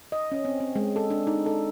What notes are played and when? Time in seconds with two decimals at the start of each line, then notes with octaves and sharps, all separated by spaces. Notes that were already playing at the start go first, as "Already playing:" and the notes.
0.12 D#5
0.32 C#4
0.45 C4
0.60 C4
0.76 G#3
0.96 A4
1.10 D4
1.27 D#4
1.46 A4